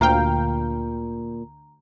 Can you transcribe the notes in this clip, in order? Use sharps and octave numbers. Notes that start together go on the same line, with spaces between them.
D2 A#2 F5 G5 A#5